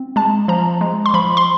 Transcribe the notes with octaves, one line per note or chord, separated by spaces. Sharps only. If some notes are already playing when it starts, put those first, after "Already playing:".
Already playing: C4
G#3 A5
F3 A#5
G#3
C6
F3 B5
C6